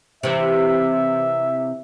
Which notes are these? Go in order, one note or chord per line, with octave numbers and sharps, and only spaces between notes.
C3 E3 E5